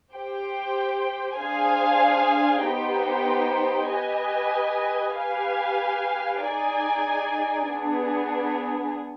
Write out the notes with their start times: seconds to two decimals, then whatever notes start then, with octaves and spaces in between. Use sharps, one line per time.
0.14 G4 C5 G5
1.39 D4 G#4 C5 F5 G#5
2.65 B3 D#4 G4 C5 G5
3.91 G4 B4 D#5 G#5
5.16 G4 B4 F5 G#5
6.43 D#4 G#4 D5 G#5
7.68 B3 D4 G#4